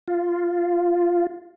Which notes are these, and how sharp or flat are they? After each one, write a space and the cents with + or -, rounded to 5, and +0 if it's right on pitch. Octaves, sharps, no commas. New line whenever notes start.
F4 -5